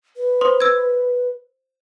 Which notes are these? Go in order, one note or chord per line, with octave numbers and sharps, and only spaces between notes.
B4
C5 C6 D#6
E6 G#6